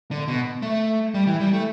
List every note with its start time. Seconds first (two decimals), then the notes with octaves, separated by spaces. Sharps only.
0.11 D3
0.28 B2
0.62 A3
1.14 G3
1.27 E3
1.40 G3
1.53 A3